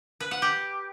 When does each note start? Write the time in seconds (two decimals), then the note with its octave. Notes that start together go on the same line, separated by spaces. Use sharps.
0.20 B4
0.31 F#5
0.42 G4